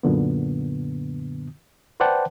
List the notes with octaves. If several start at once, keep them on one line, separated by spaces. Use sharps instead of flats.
F#2 A#2 D3 B3
B4 C5 D5 F#5 G5 A5